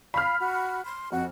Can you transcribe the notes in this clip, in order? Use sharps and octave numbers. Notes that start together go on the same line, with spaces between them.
F5 B5 F6
F#4
C6
F2 F#4